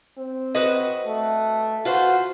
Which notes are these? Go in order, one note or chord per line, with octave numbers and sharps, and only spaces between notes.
C4
F#4 B4 D#5
A3
F4 F#4 B4 C5